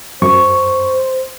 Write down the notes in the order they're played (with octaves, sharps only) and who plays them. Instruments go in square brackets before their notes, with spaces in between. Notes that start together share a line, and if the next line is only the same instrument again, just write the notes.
[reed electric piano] F#2 C#6 [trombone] C5